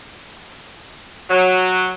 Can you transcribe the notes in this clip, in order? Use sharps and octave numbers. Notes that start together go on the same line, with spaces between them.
F#3